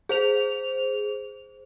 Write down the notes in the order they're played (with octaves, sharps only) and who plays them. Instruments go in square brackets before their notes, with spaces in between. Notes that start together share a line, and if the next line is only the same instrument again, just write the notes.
[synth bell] G#4 C5 F7